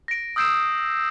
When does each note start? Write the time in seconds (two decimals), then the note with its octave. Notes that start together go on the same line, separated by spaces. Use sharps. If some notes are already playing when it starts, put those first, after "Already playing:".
0.08 A#6 D7
0.36 D#6 E6 G6 C7 D7 E7